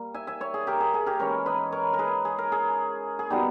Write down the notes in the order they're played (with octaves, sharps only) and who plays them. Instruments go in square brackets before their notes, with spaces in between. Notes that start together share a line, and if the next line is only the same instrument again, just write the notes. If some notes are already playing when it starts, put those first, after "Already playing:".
Already playing: [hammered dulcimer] G3 A#3
E5 G#5
E5 G#5
C#5 E5
G#4
G4 A#4
G#4
G#4
G4 A#4
E3 G#3 C#4 A#4 C#5
B4 D#5
A#4 C#5
A#4
G#4 B4
G#4
A#4
G#4
G#4
B2 G3 B3 D#4 G4